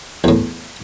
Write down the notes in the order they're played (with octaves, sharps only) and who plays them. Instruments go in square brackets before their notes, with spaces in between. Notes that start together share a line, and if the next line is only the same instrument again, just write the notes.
[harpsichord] E2 A2